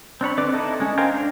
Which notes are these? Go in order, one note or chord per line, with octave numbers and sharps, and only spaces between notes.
C4 D4 C#5 B5
D3 C4 B4 D5 D6
D#4 E4 A4 D#5
G#3 C#4
A#4 C5 F5 G5 G#5
D4